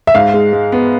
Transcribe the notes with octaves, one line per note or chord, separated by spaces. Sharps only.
E5
G#2 F5
G#3
G#3
B3